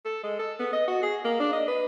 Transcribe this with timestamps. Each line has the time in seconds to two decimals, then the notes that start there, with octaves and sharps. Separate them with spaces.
0.05 A4
0.24 G#3
0.39 A4
0.59 B3
0.73 D#5
0.88 F#4
1.02 G#4
1.24 A#3
1.40 D4
1.53 D#5
1.68 B4